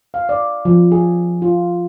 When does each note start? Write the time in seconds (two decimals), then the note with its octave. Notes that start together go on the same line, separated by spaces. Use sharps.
0.14 F5
0.29 D5
0.65 F3
0.92 G#4
1.42 F4